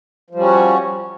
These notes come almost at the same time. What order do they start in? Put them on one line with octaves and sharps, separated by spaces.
F3 G3 C#4 F#4